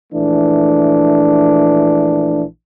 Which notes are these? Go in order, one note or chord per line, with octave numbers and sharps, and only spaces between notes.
A#1 E3 A3 D4